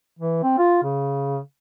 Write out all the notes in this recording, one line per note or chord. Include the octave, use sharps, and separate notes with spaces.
E3
C4
F4
C#3